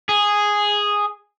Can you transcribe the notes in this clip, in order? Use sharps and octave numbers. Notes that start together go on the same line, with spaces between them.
G#4